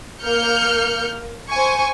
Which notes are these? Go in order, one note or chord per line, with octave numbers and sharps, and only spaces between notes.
A#3 F6 G6 C#7
C5 G#5 C#6